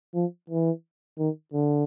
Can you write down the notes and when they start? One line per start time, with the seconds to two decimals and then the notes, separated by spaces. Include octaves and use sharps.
0.14 F3
0.50 E3
1.19 D#3
1.54 D3